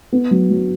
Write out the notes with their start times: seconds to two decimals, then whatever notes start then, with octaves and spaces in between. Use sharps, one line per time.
0.12 B3
0.31 F#3
0.50 F#3